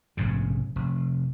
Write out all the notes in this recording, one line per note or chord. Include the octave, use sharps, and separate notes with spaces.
F1 A#1 G#2 C#3
F1